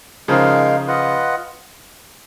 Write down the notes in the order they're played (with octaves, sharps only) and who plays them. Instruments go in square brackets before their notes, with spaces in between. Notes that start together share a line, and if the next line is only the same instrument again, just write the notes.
[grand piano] C#3 F3 [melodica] G#3 D#4 A#4 F5
[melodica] F4 B4 D#5 F#5